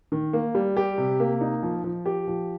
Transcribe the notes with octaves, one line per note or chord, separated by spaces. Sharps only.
D#3
A#3
G3
G4
C3
A#3
D#4
F3
F3
G4
F3